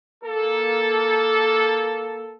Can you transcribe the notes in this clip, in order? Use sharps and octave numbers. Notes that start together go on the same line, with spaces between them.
A#3 A4